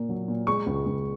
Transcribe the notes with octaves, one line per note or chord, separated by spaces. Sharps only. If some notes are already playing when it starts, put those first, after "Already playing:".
Already playing: A#2 A#3
F#3
A#2
G#3 C#6
C#2
C#2